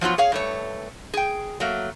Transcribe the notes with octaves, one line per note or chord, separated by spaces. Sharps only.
F3 F#3 B3 F4
G#4 C#5 F5
G2 A3 C#5
G#4 G5
F#3 A3 A#3